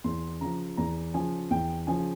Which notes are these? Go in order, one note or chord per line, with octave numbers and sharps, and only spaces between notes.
E2 C6
C#3 F3 A#5
E2 A#5
C#3 F3 G#5
E2 G5
C#3 F3 G#5